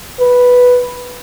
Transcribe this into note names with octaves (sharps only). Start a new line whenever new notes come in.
B4